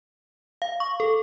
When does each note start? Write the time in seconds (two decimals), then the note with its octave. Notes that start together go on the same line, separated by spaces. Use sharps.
0.62 F5
0.80 C#6
1.00 A4